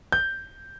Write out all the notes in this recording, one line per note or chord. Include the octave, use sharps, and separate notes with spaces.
G6